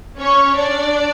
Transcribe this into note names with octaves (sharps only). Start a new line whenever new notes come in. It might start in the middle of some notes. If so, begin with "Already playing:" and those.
C#4 C#5
D4 D5